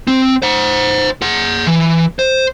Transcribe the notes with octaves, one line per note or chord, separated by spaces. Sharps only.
C4
C5 F#5
G#4 F#5
E3
C5